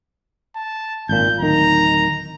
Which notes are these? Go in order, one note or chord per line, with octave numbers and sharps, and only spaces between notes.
A5
G#1 A#2 G6
D1 D#3 A#5